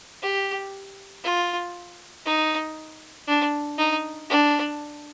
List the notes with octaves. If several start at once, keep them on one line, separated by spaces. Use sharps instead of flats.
G4
F4
D#4
D4
D#4
D4